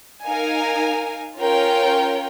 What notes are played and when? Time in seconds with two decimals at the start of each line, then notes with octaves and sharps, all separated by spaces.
0.24 D#4 A#4 F5 G#5
1.37 C#4 F4 A#4 C#5 G5